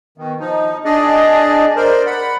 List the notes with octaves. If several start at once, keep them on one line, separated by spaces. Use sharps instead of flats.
B2 D#3
F3 D#4
D4 G#4 D5 D#5
A#4 C5 D5
F#5 B5